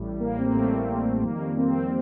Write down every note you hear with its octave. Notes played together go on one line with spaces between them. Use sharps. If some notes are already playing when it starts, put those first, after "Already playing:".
Already playing: A1 A2 G3
A#3
C4
A#3
A1 A2 G3 A3
F2 D#3 G3 A#3
C4